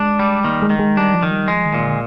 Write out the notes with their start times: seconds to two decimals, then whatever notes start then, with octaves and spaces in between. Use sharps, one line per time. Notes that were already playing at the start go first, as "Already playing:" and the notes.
Already playing: G#3 D4
0.19 G3
0.44 D#3 A#3
0.62 G#3
0.70 D#3
0.79 G#3
0.97 G3 D4
1.14 F3
1.23 D#3
1.31 G3
1.48 F3 G#3
1.66 D#3
1.74 A#2
1.83 D3